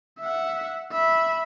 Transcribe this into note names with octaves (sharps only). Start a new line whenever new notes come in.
E5 F#5
E5 B5